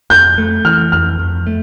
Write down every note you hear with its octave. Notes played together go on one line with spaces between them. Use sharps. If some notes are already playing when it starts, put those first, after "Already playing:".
F2 G6
A3
E3 F6
F2 F6
F2
A3